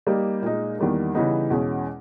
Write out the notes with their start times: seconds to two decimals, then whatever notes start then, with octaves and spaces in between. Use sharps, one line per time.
0.07 G3 A#3 D#4 G4
0.42 A#2 G#3 D#4
0.78 E2 D#3 G3 A#3 D#4
1.15 C#3 E3 G3 B3 D#4
1.50 E2 B2 G#3 C#4 G#4